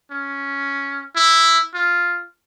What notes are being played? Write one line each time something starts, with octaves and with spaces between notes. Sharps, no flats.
C#4
E4
F4